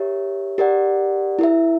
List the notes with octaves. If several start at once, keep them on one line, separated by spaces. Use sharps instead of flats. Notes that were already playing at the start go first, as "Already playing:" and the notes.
Already playing: G4 A#4 C#5 E5
G4 A#4 D5 F#5
E4 A#4 E5